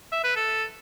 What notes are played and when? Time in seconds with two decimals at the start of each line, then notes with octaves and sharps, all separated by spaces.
0.12 E5
0.24 B4
0.36 A4